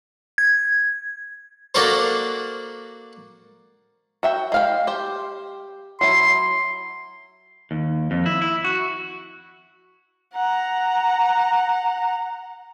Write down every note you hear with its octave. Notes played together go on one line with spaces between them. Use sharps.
G#6
A#3 D4 F#4 A4 A#4 C5
F#4 E5 G5
G#3 F5 G5
G4 C5
F#3 E4 C6
D#2
F2
E4
E4
F#4
F#5 A#5